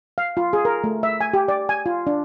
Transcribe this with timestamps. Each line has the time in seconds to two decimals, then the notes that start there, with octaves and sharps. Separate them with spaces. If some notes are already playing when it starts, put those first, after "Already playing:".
0.18 F5
0.37 F4
0.53 G#4
0.65 A#4
0.84 A3
1.03 E5
1.21 G#5
1.34 G4
1.48 D5
1.69 G#5
1.86 F4
2.07 D4